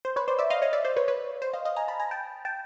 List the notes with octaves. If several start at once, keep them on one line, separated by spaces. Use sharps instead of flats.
C5
B4 C#5
C5 D5
D5 E5
D#5 F5
C#5 D#5
D5 E5
C5 D5
B4 C#5
B4 C#5
C5
D#5 F5
D#5 F5
G#5 A#5
A5 B5
G#5 A#5
G5 A5
G5 A5